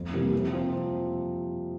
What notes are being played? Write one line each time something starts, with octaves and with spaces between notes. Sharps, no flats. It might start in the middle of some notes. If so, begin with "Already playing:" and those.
Already playing: F2
C3 E3 G3 A#3
C3
F3 C4